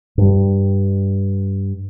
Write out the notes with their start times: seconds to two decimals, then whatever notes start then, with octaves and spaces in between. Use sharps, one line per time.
0.18 G2 G3